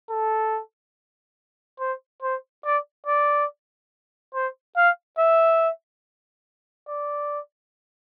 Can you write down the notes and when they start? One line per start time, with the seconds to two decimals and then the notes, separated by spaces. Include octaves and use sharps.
0.10 A4
1.80 C5
2.23 C5
2.65 D5
3.07 D5
4.34 C5
4.77 F5
5.19 E5
6.88 D5